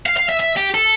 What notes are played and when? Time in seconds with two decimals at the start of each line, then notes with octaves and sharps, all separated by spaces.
0.06 F5
0.17 F5
0.29 E5
0.40 E5
0.57 G4
0.74 A4